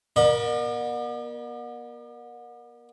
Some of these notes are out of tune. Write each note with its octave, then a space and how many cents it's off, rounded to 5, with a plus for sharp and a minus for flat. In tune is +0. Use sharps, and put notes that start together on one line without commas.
B3 -40 A#4 +15 D5 +45